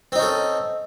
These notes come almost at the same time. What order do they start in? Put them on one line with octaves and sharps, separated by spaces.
C4 D#4 C#4 A4